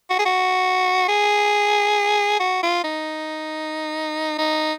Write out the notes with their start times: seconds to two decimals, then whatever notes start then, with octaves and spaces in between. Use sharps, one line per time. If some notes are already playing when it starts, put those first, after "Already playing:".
0.10 F#4
0.19 G#4
0.26 F#4
1.08 G#4
2.40 F#4
2.63 F4
2.84 D#4
4.38 D#4